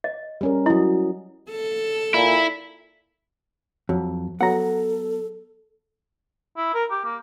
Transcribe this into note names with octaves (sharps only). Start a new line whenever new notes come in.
D#5
G3 C#4 A#4
F#3 E4 D#5
A4
A#2 E4
F2 F#3
F#3 B3 A4 F#5 A#5
E4
A#4
G4
A#3